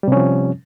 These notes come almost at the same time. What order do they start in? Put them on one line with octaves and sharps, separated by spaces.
G3 C3 C#4 F3